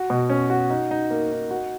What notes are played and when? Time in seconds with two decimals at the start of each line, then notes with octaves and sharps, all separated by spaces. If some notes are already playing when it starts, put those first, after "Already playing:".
Already playing: F#4
0.10 B2
0.30 C#4
0.50 F#4
0.70 D#4
0.91 D#4
1.10 A#3
1.31 D#4
1.51 F#4